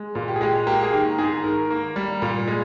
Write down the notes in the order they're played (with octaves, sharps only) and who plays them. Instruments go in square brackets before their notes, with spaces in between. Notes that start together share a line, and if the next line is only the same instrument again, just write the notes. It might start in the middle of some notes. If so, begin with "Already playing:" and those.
Already playing: [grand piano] G#3
A#2
G4
G#4
G#3 G4
A#3 G4
G#4
D#3 G4
G#2 G#4
D#3 A#4
A#3
G3
A#2
G#3